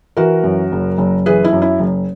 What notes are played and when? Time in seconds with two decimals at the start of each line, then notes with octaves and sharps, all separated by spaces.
0.17 E3 F#4 A#4
0.44 F#2
0.72 F#1
0.98 F#1
1.26 E3 G#4 B4
1.44 E4
1.53 F#2
1.62 E4
1.80 F#1